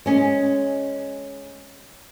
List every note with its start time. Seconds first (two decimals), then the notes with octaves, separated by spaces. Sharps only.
0.06 G#3 C#4